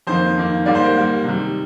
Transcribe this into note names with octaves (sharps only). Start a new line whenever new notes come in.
F2 D#3 A#3 C5
F2 D#3 A#3
G#2 G3 A#3 D5
C5
A#4
G#2 G3 A#3 A#4
C3 D#3 G3